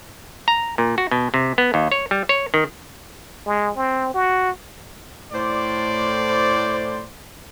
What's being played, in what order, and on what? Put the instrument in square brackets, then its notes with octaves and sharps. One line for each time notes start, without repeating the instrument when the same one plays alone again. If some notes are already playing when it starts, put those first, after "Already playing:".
[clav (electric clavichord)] A#5
A#2
F#4
B2
C3
B3
D#2
C#5
G3
C#5
D#3
[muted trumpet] G#3
C4
F#4
[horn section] A2 C5 D5